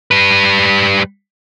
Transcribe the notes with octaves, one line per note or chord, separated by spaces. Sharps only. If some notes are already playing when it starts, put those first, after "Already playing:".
G3 B4